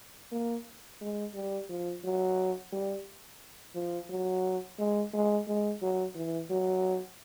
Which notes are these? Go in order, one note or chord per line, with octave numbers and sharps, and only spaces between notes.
A#3
G#3
G3
F3
F#3
G3
F3
F#3
G#3
G#3
G#3
F#3
E3
F#3